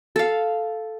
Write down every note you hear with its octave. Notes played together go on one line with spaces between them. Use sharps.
A4 F5